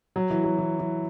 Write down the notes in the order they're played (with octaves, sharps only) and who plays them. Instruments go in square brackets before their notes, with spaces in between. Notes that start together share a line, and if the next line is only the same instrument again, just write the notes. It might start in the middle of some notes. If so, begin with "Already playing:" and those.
[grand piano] F#3
E3
F#3
E3
E3